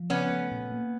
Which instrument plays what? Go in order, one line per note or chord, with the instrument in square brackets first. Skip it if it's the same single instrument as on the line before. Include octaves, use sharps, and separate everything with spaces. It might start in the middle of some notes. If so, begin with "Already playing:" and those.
Already playing: [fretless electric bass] F3
[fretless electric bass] C#3 [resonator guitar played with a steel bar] B3 C#4
[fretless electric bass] A3
A#2
A#3